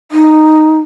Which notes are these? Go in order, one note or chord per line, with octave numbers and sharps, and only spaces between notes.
D#4